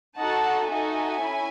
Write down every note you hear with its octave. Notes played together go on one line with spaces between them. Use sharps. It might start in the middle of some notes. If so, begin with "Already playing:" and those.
D#4 F#4 A4 F#5 A5
D#4 F#4 A4 E5 G#5
C#4 E4